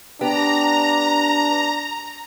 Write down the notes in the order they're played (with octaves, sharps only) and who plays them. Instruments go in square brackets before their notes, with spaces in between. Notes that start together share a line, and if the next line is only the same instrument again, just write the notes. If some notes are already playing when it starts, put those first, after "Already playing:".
[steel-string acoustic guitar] B3 G4 [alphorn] D4 [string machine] A#5